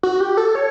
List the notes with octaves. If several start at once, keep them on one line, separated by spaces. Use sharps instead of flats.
F#4
G4
A4
C#5